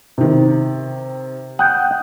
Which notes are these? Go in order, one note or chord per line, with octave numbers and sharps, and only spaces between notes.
C3 D#3
F#5 G5 D#6